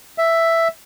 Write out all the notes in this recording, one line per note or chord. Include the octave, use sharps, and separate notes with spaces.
E5